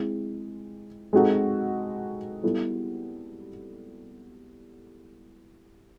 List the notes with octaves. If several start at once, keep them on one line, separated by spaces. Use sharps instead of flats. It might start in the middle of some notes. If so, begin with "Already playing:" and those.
Already playing: G#3 C4 E4
G#3 C4 D#4 F#4 A4
G3 B3 E4 A4